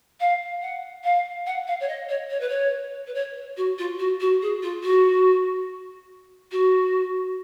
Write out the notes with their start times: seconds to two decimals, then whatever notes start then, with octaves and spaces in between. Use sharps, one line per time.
0.20 F5
0.62 F#5
1.04 F5
1.46 F#5
1.67 F5
1.80 C#5
1.88 D#5
2.09 C#5
2.30 C#5
2.40 B4
2.49 C#5
3.07 B4
3.14 C#5
3.57 F#4
3.78 F4
3.99 F#4
4.20 F#4
4.42 G#4
4.62 F4
4.83 F#4
6.51 F#4